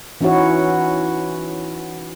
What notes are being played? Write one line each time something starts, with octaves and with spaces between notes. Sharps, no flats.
E3 C#4 D#4 E4 F#4 C#5